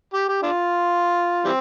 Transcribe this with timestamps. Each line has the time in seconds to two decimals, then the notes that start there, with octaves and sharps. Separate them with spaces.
0.14 G4
0.28 G4
0.43 D4 F4
1.44 E3 G3 C4